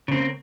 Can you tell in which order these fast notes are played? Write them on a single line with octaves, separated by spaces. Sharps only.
C#3 C4 A#3